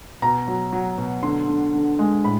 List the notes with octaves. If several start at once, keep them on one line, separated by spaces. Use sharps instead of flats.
B2 A#5
F#3
F#3
B2
D3 C6
D3
D3
G#3
A2 B5